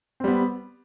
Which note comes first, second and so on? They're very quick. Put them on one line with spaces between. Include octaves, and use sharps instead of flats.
C4 G3 B3